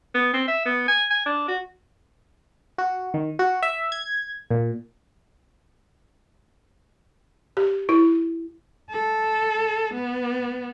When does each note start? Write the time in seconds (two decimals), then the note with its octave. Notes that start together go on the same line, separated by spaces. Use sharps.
0.15 B3
0.34 C4
0.48 E5
0.66 B3
0.88 G#5
1.11 G#5
1.26 D4
1.48 F#4
2.78 F#4
3.14 D#3
3.39 F#4
3.63 E5
3.92 G#6
4.51 A#2
7.57 G4
7.89 E4
8.91 A4
9.94 B3